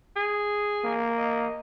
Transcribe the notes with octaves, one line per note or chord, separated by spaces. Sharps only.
G#4
A#3
D#5